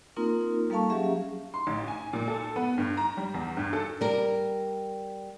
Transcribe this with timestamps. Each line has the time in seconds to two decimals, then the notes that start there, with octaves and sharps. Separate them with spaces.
0.17 A#3 C4 D#4 F4 A#4
0.70 G3 A#3 A4 F5 A5 C#6
0.90 F#3 C#4 G4 G#4 E5 F5
1.54 C6
1.67 A1
1.88 G#5
2.13 A#2
2.28 A4
2.56 B3
2.78 G2
2.97 A#5
3.17 G3
3.34 E2
3.57 G2
3.73 A4
4.01 G3 A#4